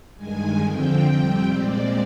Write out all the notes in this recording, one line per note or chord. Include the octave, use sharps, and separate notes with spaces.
G2 D#3 G#3 G#5
F2 D3 F3 C4 G5
F2 C3 G3 C4
A#2 G#3 C4 D5